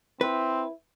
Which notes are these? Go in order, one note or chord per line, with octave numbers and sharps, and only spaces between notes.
C4 E4 B4